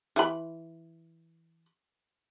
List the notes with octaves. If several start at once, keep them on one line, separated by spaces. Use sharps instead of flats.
E3 B5